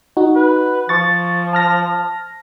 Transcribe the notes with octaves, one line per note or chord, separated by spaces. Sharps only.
D#4 F#4
B4
F3 C#6 A6
A5 F6 A#6